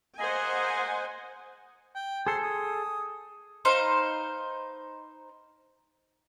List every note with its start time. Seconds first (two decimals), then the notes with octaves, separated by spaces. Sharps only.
0.20 A#3 G#4 C5 D#5 F#5 G#5
1.95 G5
2.27 G#4 A4 C5
2.43 D#6
3.65 D#4 B4 C5 F5